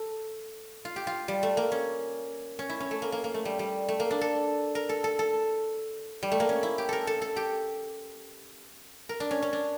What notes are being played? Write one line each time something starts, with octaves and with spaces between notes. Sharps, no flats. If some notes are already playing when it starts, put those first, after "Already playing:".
Already playing: A4
F4
G4
F4
G3
A3
A#3
C#4
C#4
E4
C#4
A3
A#3
A#3
A#3
A3
G3
G3
A3
A#3
D4
A4
A#4
A4
A4
A4
G3
A3
A#3
C#4
E4
G4
A4 A#4
A4
A4
G4
A#4
D4
C#4
C#4
D4